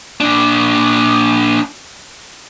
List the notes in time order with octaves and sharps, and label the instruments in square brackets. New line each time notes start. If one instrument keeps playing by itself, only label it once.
[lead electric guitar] A#2 D4